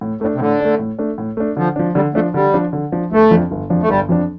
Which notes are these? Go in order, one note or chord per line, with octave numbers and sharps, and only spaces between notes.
A2
A2 A3 D4
C3
A2 D3
A3 D4
A2
A3 D4
A2
A3 D4
D3 F3
F3 D4
D3 G3
F3 A3 D4
D3 G3
F3 D4
D3
F3 D4
G1 A3
F2 F3 D4
G1
F2 F3 D4
A3
G1 G3
F2 F3 D4